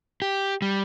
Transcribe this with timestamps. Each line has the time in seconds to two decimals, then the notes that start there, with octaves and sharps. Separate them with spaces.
0.22 G4
0.62 G3